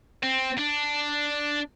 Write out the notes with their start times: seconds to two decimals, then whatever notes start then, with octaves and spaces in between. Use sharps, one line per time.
0.23 C4
0.58 D4